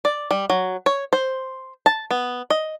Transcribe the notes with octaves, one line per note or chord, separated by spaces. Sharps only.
D5
G3
F#3
C#5
C5
A5
B3
D#5